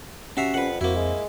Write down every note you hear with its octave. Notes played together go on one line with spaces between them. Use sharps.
C#4 F#4 G4 E5 A#5 C7
F2 B4 F#5
F2 A#3 C4 E4 F#4 C5
G#3